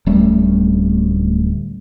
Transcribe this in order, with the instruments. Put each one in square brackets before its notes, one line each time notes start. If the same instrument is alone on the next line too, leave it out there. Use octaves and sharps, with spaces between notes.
[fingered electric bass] D1 G3 A3 C#4